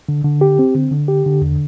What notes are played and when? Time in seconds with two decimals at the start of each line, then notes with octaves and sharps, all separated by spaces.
0.09 D3
0.24 D3
0.41 G4
0.59 C4
0.75 D3
0.91 D3
1.08 G4
1.26 D3
1.42 E2